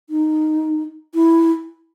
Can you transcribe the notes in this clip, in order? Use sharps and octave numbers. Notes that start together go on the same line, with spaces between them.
D#4
E4